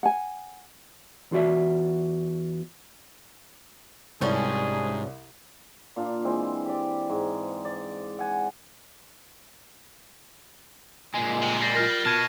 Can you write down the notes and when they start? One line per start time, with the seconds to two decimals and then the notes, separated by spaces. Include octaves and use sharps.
0.03 F#5 G#5
1.31 E2 F4 F#4 D5 E5
4.21 C2 G#2 F3 G3 C#4 G#4
5.96 A#2 D4 F5
6.24 E3 G#3 C4
6.65 G4 D5
7.09 G#2
7.65 D5
8.19 F#5 G#5
11.14 A#2 G#3 G#5
11.42 C3
11.62 G3 A6 A#6 C7
11.75 F4 A#4 F6 A#6
12.06 B2 A5 F6 G#6 D#7